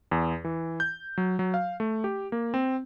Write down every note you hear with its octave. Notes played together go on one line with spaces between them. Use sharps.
E2
E3
G6
F#3
F#3
F5
A3
G4
A#3
C4